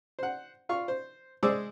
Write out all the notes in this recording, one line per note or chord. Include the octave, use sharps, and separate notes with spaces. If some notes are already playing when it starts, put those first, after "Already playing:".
C5 F#5
F4 F5 C#6
C5
G#3 G#4 C5 D5 D6 E6